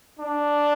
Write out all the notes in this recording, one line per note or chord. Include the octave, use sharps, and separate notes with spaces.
D4